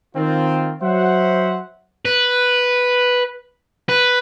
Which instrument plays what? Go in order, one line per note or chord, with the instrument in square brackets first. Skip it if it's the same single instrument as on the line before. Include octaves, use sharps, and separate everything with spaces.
[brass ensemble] D#3 C4 F4
F#3 C5 E5 F#5
[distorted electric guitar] B4
B4